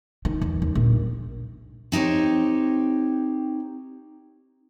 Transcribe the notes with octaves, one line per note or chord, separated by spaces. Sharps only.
D#3
E2
D#2
A#1
C4 D#4 G4 C#5